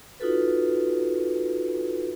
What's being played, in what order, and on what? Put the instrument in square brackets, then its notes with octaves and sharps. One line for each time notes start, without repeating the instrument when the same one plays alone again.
[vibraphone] D#4 F4 F#4 A4 B4